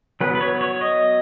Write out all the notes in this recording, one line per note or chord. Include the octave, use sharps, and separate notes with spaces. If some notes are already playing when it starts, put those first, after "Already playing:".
F#3 B3 B4
B4
C#5
C#5
D#5